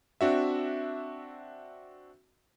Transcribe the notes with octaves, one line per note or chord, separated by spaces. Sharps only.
C4 D4 F#4 E5